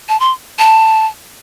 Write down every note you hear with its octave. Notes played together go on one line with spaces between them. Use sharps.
A5
C6
A5